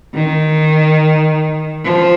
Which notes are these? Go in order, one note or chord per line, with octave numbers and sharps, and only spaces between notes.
D#3
F3